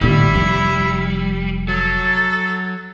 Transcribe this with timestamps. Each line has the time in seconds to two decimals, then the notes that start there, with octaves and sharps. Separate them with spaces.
0.01 A1 D3 G3 E4
0.33 F1 F3
1.68 F#3 A4